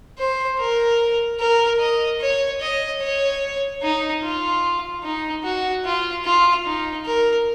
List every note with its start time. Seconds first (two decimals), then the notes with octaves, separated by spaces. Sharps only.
0.18 C5
0.59 A#4
1.40 A#4
1.80 D#5
2.21 C#5
2.61 D#5
3.01 C#5
3.82 D#4
4.23 F4
5.03 D#4
5.44 F#4
5.85 F4
6.25 F4
6.66 D#4
7.06 A#4